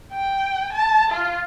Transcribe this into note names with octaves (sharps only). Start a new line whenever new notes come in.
G5
A5
F4